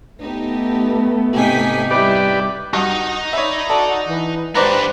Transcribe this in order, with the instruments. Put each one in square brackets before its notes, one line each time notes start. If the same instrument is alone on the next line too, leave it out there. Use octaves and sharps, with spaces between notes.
[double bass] A3 B3 [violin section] D#4 G4
[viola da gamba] G#2 C3 D#4 [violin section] G4 G#5 B6
[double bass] G3 [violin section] E4 [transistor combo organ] G4 B4 D5
[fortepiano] G2 [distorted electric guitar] D#4 D#5 [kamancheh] F#4 F#5
[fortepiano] C#5 E5 [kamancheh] D5 B5
[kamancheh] F#4 [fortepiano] A4 [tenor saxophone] D5
[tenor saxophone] E3 [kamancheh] B4
[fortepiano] G#2 D5 A#5 [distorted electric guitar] B3 D4 [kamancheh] G4 C5 [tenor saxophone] B4